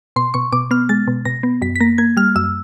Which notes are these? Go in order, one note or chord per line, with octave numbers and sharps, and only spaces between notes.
B2 C6
B2 C#6
B2 D6
B3 F6
G#3 A6
B2
B2 A#6
B3
F#2 B6
B6
A#3 A#6
A#3 G#6
G3 F6
F#2 E6